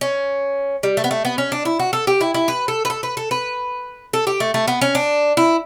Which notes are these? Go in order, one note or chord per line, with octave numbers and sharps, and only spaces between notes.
C#4
G3
A3
B3
A3
B3
C#4
D4
E4
F#4
A4
G4
E4
E4
B4
A4
B4
A4
B4
A4
B4
A4
G4
A3
A3
B3
C#4
D4
E4